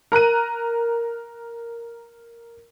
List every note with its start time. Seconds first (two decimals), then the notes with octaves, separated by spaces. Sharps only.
0.12 A#4 A#5 F#6 D#7